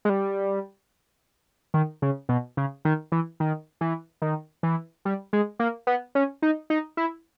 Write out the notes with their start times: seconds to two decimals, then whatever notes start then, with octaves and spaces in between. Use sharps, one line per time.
0.05 G#3
0.09 G3
1.74 D#3
2.02 C#3
2.29 B2
2.57 C#3
2.85 D#3
3.12 E3
3.40 D#3
3.81 E3
4.22 D#3
4.63 E3
5.05 G3
5.33 G#3
5.60 A#3
5.87 B3
6.15 C#4
6.42 D#4
6.70 D#4
6.97 E4